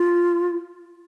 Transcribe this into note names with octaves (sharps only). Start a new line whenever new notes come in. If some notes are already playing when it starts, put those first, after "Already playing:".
Already playing: F4